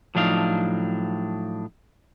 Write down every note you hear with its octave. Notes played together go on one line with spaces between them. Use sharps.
A2 F3 F#3 D4 D#4 F5